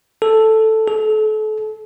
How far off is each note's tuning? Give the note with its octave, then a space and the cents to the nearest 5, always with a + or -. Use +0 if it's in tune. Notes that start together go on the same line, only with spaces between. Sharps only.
A4 +0
A4 -35